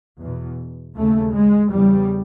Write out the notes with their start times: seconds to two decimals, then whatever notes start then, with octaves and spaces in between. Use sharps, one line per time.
0.20 E2 B2
0.96 D#2 C#3 A3
1.34 G#3
1.72 E2 C#3 G3